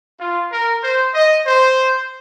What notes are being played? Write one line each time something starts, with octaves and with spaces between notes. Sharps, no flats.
F4
A#4
C5
D#5
C5